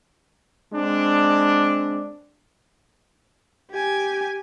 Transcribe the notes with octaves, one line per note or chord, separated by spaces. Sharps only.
G#3 C4 D4
G4 G#5